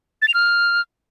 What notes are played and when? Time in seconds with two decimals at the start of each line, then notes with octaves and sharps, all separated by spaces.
0.22 A6
0.28 F7
0.34 F6